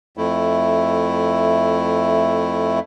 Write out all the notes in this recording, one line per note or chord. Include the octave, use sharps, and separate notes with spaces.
F2 A3 E4